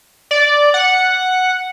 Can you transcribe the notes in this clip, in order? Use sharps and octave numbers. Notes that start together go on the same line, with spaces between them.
D5
F#5